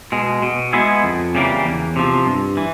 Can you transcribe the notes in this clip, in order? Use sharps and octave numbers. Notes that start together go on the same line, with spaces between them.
B2 G#3
B2
G#3 B3 E4 G#4
F2
C#3 E3 G3 A#3
E2
C3 F3
G2
E3